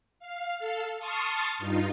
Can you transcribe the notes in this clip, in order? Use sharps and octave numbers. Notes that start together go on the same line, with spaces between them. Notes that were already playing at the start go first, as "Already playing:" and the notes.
F5
A4 F5
A5 C6 C#6 D#6 F6 A6
G2 D#4 F4